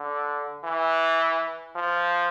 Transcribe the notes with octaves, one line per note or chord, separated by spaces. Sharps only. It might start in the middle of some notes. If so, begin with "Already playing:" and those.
Already playing: D3
E3
F3